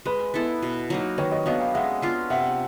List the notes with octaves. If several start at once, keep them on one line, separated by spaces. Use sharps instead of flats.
G#3 B4
B3 E4 A4
B2
F#3 A#3 D#4
D#3 B4 C#5
C#5 D#5
F#3 B3 D4 D#5 F5
F5 G5
G#3 E5 F#5
B3 D4 F4
C3 E5 F#5